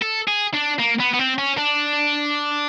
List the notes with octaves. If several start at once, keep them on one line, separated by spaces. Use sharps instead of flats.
A4
G#4
D4
A#3
B3
B3
C4
C#4
D4